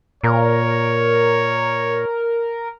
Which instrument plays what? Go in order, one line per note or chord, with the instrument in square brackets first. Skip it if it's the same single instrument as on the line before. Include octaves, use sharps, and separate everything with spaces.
[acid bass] A#2 [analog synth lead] A#4 [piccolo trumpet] C#5